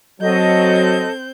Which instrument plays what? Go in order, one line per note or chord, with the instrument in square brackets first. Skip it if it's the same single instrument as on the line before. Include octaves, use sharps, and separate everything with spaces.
[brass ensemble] F#3 [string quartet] C4 G6 [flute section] A4 D#5